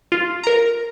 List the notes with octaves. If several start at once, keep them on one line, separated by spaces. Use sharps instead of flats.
F4
A#4 A#5